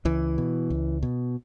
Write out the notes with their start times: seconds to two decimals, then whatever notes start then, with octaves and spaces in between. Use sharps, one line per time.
0.05 C#2 E3
0.38 B2
0.70 C#2
1.03 B2